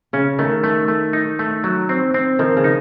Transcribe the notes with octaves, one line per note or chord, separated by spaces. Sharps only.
C#3 C#4
D#3 A3
A3
A3
D#4
A3
F#3
C4
C4
D#3 F3
C#3
D#4